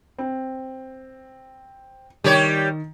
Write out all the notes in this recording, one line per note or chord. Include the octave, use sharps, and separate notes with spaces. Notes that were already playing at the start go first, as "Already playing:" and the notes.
C4
D#3 G3 G4 C#5